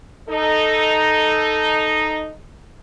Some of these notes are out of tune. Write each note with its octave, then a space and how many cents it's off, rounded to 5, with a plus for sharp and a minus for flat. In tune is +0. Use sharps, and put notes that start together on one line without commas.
D#4 -5 A4 +0